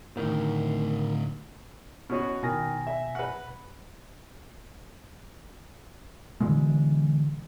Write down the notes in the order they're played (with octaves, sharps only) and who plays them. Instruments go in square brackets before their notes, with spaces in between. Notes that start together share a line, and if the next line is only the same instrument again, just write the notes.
[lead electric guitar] A2 D3 [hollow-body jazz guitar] D#3
[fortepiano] B2 C#4 F#4
[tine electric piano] B2 G#5 A#6 [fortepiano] D#3
[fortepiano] E5
B4 F#5
[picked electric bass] B2 D3 E3 G#3